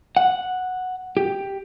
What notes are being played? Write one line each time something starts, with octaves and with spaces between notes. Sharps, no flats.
F#5
G4